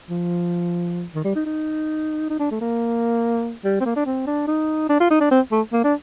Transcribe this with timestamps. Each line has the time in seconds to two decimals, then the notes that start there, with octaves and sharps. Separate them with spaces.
0.10 F3
1.14 D#3
1.24 G3
1.35 D#4
1.46 D#4
2.30 D#4
2.39 D4
2.51 A3
2.61 A#3
3.64 G3
3.80 C4
3.85 A#3
3.96 D4
4.06 C4
4.27 D4
4.47 D#4
4.89 D4
5.00 F4
5.10 D#4
5.20 D4
5.31 C4
5.52 A3
5.73 A#3
5.84 D4